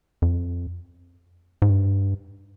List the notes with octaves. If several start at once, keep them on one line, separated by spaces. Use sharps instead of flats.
F2
G#2
G2